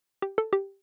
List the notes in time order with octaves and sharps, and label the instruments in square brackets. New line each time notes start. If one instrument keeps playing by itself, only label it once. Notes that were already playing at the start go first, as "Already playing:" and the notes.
[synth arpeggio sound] G4
A4
G4